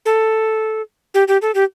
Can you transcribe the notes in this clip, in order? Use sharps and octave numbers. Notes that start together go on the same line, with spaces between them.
A4
G4
G4
A4
G4